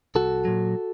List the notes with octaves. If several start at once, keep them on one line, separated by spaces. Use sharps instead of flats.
C2 F#4 A4
A#2 F#3